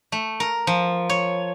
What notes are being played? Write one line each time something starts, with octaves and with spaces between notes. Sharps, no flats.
A3
A#4
F3
C#5